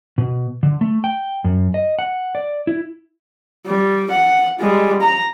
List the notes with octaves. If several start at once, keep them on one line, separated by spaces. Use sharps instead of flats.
B2
D3
A3
G5
F#2
D#5
F#5
D5
E4
G3
F#5
G3 G#3
A#5